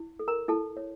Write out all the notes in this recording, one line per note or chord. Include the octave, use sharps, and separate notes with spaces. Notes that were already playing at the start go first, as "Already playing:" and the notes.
Already playing: E4
A4
A#4 A#5
E4 A4 A5
C#5